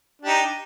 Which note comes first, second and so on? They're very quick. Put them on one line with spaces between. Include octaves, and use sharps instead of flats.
D4 G4 D#4